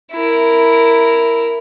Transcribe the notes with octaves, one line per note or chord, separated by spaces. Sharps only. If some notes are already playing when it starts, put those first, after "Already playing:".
E4 A#4